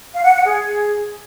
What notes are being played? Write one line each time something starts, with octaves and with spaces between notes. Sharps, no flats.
F5
F#5
F#5
G#4